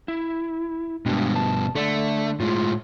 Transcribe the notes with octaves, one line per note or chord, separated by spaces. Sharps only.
E4
G2 B2 G#3 D4
A5
D3 A3 D5
A2 G#3 F4